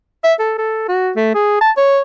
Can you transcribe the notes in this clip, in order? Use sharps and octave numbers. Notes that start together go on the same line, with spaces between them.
E5
A4
A4
F#4
A3
G#4
A5
C#5